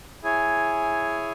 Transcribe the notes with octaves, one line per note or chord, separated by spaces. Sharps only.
E4 G#4 C#5 G#5